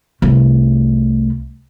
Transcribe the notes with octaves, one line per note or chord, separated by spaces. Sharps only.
C2 A3